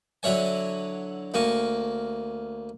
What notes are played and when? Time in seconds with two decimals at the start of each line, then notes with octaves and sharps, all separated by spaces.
0.23 D3 F#3 E4 C#5 G#5
1.34 D2 A#3 G#5 C#6